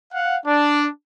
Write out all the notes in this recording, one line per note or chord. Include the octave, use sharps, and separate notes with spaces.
F5 F#5
D4